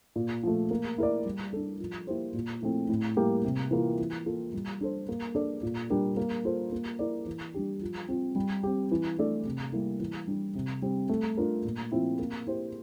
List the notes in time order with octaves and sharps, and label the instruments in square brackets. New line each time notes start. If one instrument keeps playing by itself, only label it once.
[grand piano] A#2
F3 A3
A#3
E4 A#4 D5
G3
D4 A4
F3
A#3 E4 G4 C5
A#2
F3 A3 C4 E4
A2
G3 A#3 E4 G4
C3
E3 A#3 F4
E3
A#3 F4 A4
G3
D4 A4 C5
A#3
D4 A4 D5
A#2
G3 D4 G4 A#4
A#3
F4 A4 C5
A#3
E4 A#4 D5
E3
G3 D4 G4
F3
C4 F4
G3
C4 G4
E3
A3 D4 A4 D5
C3
G3 A#3 E4
E3
G3 D4
C3
G3 C4 G4
A3
D4 F4 A#4
A#2
F3 C4 E4
A#3
E4 G4 C5